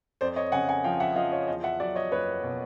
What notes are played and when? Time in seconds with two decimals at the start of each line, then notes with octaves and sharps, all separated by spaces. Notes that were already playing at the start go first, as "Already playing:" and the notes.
0.21 F2 C5 D5
0.36 C#5 D#5
0.52 C#3 F#5 G#5
0.68 F#5 G#5
0.84 F3 F5 G5
1.00 E5 F#5
1.16 F3 D#5 F5
1.32 C#5 D#5
1.48 E2 D#5 F5
1.64 E5 F#5
1.80 F#3 D5 E5
1.95 C#5 D#5
2.11 F#1 B4 C#5
2.43 B2